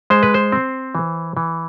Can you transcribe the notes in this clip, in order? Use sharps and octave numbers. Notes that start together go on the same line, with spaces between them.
G#3 C5
B4
C5
C4
E3
E3